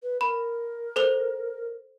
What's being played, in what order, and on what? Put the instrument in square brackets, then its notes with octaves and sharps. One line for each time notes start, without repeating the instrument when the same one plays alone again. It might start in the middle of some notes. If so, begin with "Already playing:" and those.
[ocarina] B4
[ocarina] A#4 [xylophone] B5
[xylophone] A4 C5 F7